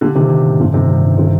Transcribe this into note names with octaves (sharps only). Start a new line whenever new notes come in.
A#2 D3 G4
C3 D#3 G4
G4
A2
G2 A#2 D3
G2 C3 D#3
G3
G2
C3 D#3 F4